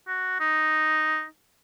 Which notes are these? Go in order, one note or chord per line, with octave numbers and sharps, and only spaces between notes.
F#4
D#4